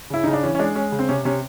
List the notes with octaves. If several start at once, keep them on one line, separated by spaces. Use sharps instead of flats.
C#3 E4
C#3 D#4
D4
E3 C#4
C#4
G#3 D4
G#3 C#4
C#3
C4
C3 C#4
C3 C#4